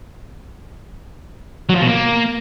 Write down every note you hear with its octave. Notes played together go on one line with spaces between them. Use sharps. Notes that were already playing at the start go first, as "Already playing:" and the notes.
F#3
F3
B2
A#3